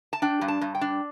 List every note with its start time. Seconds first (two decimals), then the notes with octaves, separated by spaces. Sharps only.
0.13 A5
0.22 D4 G5
0.41 G2
0.48 A5
0.61 G2
0.75 G5
0.81 D4